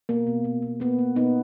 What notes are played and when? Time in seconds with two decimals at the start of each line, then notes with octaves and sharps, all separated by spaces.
0.09 B2 A#3
0.27 B2
0.44 B2
0.62 B2
0.80 A#3 B3
0.99 A#3
1.16 B2 B3 D#4